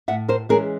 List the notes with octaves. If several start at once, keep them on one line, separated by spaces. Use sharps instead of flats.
A2 E5 F#5
A#4 C5
E3 G#3 C#4 G#4 A#4